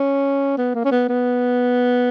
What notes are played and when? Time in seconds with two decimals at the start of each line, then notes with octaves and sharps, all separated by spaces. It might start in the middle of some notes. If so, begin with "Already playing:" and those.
Already playing: C#4
0.58 B3
0.75 A#3
0.85 C#4
0.92 B3
1.09 B3